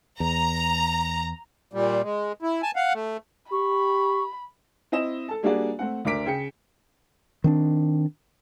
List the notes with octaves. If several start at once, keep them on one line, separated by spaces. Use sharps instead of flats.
E2 A#5
A#2 G3
G#3
E4
G#5 A5
F5 F#5
A3
G4 B5 C#6
C4 E4 D#5 E7
A4 A5
G3 A#3 D4 F#4 G#4 D5
A3 C4 F#5
D2 D4 A#4 D6 B6 D7
C#3 G5 C#7
D#3 C4 D4